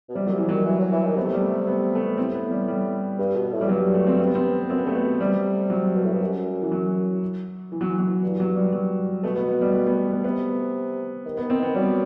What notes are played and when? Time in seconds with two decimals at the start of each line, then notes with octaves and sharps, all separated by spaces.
0.09 B2
0.15 C3 G3
0.27 D#3 F#3
0.33 C3 E3
0.49 D#3 F#3
0.66 E3
0.79 F#3
0.92 E3
1.04 D#3
1.16 C3 B3
1.25 A3
1.33 G3
1.41 A3
1.67 B3
1.95 A3
2.06 B3
2.17 A2 C4
2.34 B3
2.51 G3
2.68 G3
3.18 G2
3.36 B2
3.52 A2
3.61 G3
3.69 G2 F#3
3.94 A3
4.07 C4
4.19 C4
4.27 B3
4.35 C4
4.69 F#2 C4
4.78 B3
4.86 G2 A3
4.96 B3
5.03 B2
5.20 C3 G3
5.70 F#3
5.96 B2
6.04 A2
6.12 G2
6.21 F#2
6.62 E3
6.72 F#3
7.72 E3
7.81 F#3
7.90 E3
7.99 F#3
8.07 E3
8.23 G2
8.40 F#3
8.56 G3
8.73 F#3
9.23 B2 A3
9.36 B3
9.49 B3
9.61 G3
9.74 A3
9.86 B3
10.11 B3
10.20 B2
10.24 C3 B3
11.25 D#3
11.37 B3
11.42 D#3
11.50 C4
11.59 D#3 B3
11.75 F#3 G3